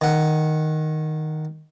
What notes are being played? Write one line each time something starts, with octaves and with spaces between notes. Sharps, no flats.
D#3 F#5